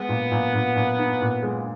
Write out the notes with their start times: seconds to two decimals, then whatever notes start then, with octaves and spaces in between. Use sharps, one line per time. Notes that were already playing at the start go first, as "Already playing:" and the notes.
Already playing: G#3 B3
0.09 A#2
0.32 A#2
0.54 A#2
0.76 A#2
0.99 D#4
1.22 A#2
1.43 G#3